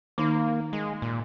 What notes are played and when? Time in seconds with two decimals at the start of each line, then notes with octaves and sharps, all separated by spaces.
0.18 D#3 A#3 D#4
0.73 G#3
1.02 A#2